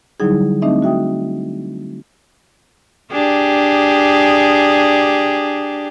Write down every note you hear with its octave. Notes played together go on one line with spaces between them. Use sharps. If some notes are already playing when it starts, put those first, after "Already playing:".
D3 F#3 G3 D#4 E4 G#4
A3 C4 D4 D#4 D#5 E5
F#4 E5 G5 D#6
D4 G4 G#4